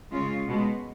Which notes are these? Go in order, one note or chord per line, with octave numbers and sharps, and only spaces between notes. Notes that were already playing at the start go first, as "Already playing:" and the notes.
C#3 G#3 C#4 F4
B2 G#3